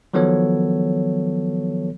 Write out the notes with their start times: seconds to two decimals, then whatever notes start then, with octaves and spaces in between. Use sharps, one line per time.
0.14 D#3 F3 F#3 B3 A4 C#5